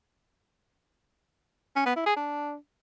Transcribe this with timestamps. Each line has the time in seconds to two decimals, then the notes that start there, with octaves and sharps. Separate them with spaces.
1.76 C#4
1.86 B3
1.96 E4
2.06 G#4
2.16 D4